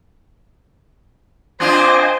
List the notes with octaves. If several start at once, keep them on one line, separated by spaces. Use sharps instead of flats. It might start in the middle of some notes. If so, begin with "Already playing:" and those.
C4 D4 F4 C5 D#5 G5 G#5